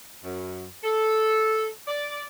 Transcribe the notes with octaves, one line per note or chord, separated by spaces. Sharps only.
F#2
A4
D5